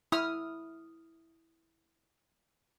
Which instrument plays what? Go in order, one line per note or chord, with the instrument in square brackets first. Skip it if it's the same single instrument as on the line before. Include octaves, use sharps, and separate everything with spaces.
[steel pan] E4 [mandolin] D#6 F6